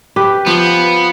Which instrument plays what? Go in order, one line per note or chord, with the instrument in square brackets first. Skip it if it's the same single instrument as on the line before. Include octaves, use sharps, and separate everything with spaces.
[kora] G4 B4
[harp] F3 [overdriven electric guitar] B3